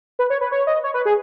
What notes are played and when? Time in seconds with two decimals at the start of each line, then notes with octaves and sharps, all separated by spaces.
0.19 B4
0.30 C#5
0.41 B4
0.52 C#5
0.67 D#5
0.83 C#5
0.94 B4
1.05 G#4